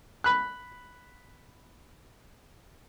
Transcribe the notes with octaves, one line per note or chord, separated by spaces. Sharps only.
B5 F#6